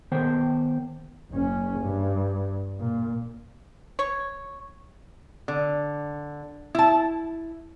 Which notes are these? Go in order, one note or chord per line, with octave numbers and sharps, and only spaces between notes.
D#3 B3 C5 G5
F#1 C#4
G2
A#2
C#5
D3
E4 A5